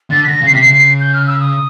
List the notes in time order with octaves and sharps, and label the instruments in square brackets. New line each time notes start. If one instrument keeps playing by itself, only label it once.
[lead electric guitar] D3 [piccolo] A6
[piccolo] B6
[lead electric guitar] D3 [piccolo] A#6
[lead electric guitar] C#3 [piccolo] C7
[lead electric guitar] C3 [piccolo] B6
[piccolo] C7
[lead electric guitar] C#3
[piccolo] C7
G6
F6
E6
D#6